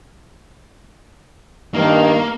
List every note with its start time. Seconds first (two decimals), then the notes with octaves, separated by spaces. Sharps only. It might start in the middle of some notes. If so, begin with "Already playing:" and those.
1.74 G2 D#3 A#3